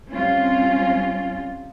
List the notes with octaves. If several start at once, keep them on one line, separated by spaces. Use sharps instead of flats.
G3 C4 C#4 F4